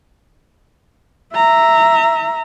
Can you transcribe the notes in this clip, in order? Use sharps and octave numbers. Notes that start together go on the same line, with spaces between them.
E5 A#5